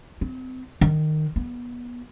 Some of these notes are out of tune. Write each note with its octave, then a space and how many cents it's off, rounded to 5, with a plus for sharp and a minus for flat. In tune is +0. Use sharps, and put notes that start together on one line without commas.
C4 -35
D#3 -15
B3 -25